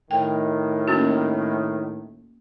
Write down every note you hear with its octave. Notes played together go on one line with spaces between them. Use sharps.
A2 D#3 G5
A#3 C#4 F#4